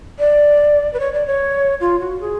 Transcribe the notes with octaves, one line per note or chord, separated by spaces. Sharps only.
D5
B4
C#5
D5
C#5
F4
F#4
G#4